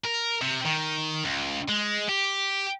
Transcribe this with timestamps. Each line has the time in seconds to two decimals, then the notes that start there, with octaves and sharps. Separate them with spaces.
0.05 A#4
0.42 C3
0.65 D#3
1.25 C#2
1.69 G#3
2.09 G4